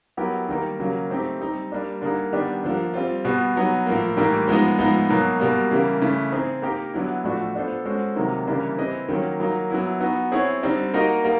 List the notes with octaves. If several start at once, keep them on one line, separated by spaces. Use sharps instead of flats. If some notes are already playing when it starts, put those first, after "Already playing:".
F#3 B3 E4 G4 A#4
D#3 G3 A#3 D#4
C#3 F#3 A#3
A3 C4 D#4 G4
G3 C4 D#4
G3 A#3 D4
D3 G3 A#3 D#4 G#4
D#3 G3 B3 D4 G4
D3 F3 A#3
G3 C4 F4
B2 G3 B3
F#3 B3 D#4
A2 F3 A#3
A2 E3 G3 A#3 D#4
F3 G#3 B3 D#4
A2 F3 G#3 B3 D#4
B2 F#3 A#3 D#4
B2 G3 A#3
C#3 E3 G3 A#3
C#3 E3 A3
C4 D#4 G#4
A#3 D#4 G4 A#4
D3 F#3 B3 E4
A2 F3 A3 D4 F#4
B3 D4 F4 A4 C5
G#3 C#4 F#4 A4 C5
C3 D#3 F#3 A#3 D#4
C#3 E3 G3 A#3 D4
C4 E4 G#4 B4 D#5
D#3 F#3 A#3 C#4
F#3 A#3 D#4
F#3 B3 E4
B3 D#4 F#4
C4 E4 G#4 C#5
D3 G3 C4 D#4
A#3 D#4 F#4 A#4 D#5
G3 A#3